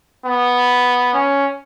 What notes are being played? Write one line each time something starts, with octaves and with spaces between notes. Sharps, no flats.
B3
C#4